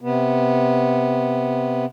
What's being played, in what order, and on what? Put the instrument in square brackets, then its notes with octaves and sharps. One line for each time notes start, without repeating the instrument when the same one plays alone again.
[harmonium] C3 B3